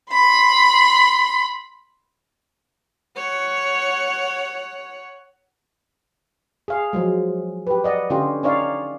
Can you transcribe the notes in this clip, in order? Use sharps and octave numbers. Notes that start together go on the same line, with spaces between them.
B5 C6
C#5 F#5
G#4 F5
F3 F#3 G#3
G4 B4
D5 D#5 F#5
D3 C#4 F4 G4
C#4 D#4 C#5 D5 F5